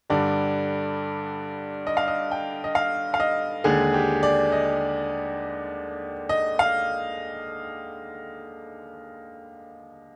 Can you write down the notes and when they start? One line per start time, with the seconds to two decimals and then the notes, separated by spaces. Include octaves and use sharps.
0.10 G2 D3 G3 D5
1.87 D#5
1.97 F5
2.08 D#5
2.31 G5
2.64 D#5
2.75 F5
3.14 F5
3.20 D#5
3.64 D#2 D3 G#3 G#4
3.94 G4
4.23 D5
4.52 D#5
6.29 D#5
6.59 F5